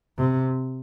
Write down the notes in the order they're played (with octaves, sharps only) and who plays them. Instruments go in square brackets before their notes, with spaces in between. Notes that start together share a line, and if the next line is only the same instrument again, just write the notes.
[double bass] C3